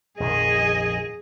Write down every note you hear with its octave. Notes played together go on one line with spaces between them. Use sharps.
A#1 F2 D#3 G#4 D#5